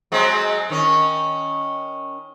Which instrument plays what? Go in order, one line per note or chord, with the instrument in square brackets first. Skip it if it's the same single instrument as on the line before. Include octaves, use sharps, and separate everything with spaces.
[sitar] F#3 G#3 C4
D#3 C#4